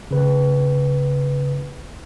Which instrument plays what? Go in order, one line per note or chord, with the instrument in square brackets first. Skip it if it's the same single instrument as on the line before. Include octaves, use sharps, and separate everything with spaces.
[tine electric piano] C#3 B4